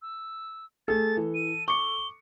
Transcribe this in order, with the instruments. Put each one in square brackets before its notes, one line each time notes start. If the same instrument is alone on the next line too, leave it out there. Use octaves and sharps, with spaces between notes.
[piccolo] E6
[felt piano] A3 G#4 [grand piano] A4 [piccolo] A6
[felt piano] E3
[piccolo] D#7
[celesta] C#6 [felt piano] D6 C#7 [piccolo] G7